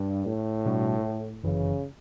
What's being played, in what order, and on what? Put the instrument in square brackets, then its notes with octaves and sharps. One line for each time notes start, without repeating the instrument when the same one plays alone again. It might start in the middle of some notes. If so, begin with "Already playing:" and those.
Already playing: [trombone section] G2
A2
[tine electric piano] B2 G3 D4 F#4
[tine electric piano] G1 F#2 E3 [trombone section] C#3